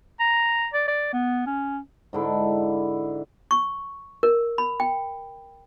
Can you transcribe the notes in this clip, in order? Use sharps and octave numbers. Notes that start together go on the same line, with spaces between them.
A#5
D5
D5
B3
C#4
G#2 D3 E4
C#6
A#4
B5
G5